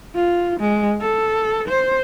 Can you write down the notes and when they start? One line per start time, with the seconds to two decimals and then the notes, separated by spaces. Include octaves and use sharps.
0.15 F4
0.60 G#3
1.01 A4
1.68 C5